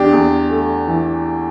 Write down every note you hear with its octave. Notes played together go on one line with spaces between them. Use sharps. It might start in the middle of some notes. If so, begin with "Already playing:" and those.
Already playing: E2 D4 G4
E2
A3
E3